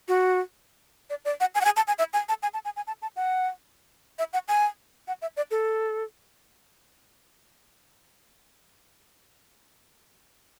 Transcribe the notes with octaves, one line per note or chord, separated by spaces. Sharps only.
F#4
D5
D5
F#5
G#5
F#5
G#5
A5
G#5
E5
G#5
A5
G#5
A5
G#5
G#5
A5
A5
F#5
E5
F#5
G#5
F#5
E5
D5
A4